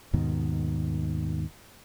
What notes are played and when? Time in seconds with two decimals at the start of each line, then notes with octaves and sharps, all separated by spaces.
0.13 D#2 G#2 B2 D#3